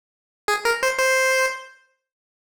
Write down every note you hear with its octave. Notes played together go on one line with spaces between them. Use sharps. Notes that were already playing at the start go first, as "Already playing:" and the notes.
G#4
A#4
C5
C5